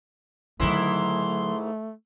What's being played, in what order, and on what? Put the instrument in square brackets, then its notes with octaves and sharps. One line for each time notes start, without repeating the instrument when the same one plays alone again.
[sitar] G#2 D#3 E4 [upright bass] D3 F#3 [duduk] A3 [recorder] C6